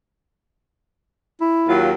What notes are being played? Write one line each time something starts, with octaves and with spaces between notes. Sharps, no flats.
E4
D#2 F#3 F4